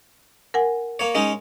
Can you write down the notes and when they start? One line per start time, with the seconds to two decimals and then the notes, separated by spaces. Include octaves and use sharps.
0.54 A#4 F#5 G#5
0.99 A#3 C#5
1.15 G#3 C#4 D#4